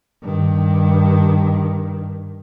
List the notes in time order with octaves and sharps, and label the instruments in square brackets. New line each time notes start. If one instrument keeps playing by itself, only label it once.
[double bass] G2 D#3